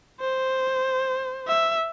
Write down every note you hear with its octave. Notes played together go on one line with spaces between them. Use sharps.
C5
E5